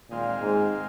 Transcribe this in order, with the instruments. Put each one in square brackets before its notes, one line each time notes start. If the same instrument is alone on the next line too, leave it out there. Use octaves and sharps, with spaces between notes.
[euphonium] A#2 [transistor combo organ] D#3 G#3 C4 F4
[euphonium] G#2